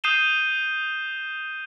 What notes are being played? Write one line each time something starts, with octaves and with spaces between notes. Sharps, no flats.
D#6 G6 C7 D#7 E7 G7